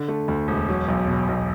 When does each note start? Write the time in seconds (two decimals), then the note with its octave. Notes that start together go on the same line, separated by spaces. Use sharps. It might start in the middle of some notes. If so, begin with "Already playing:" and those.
Already playing: D3
0.08 A3
0.28 D2
0.48 E1
0.69 F#3
0.88 B1
1.08 B2
1.28 B1